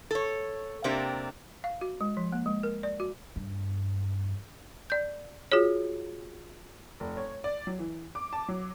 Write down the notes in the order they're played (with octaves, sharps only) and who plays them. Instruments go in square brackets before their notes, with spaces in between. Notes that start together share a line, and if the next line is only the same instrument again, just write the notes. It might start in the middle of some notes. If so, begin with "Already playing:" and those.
[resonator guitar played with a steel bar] A4 C#5
C3 A#3 C4 D4 G4
[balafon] F5
F#4
G#3
F3
A#3
G#3
A#4
D5
F#4
[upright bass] G2
[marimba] D5 G6
F4 F#4 G#4 C#5
[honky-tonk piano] F1
C#5
D5
F#3
E3
D6
A5
F#3